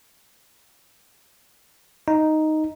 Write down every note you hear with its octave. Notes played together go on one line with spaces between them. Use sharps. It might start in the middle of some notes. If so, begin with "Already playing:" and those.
D#4